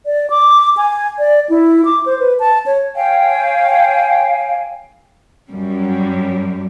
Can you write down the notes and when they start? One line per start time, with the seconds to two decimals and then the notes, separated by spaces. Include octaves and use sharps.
0.06 D5
0.30 D6
0.77 G#5
1.19 D5
1.50 E4
1.85 D6
2.06 C5
2.19 B4
2.40 A5
2.66 C#5
2.94 C#5 F5 G5 G#5
5.49 F#2 G3